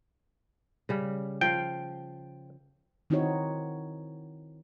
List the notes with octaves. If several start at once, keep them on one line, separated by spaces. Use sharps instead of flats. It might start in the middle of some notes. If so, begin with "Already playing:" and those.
C#3 G3
F3 F5 G5
D#3 C4 D#4 E4 F#4 C#5